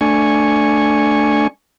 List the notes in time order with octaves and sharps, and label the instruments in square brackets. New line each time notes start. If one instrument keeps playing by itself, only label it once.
[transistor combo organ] A3 D4 G#5 C#6